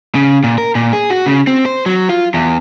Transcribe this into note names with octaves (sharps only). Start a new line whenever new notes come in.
C#3
A#2
A#4
A#2
G#4
F#4
C#3
C4
C5
F#3
F4
E2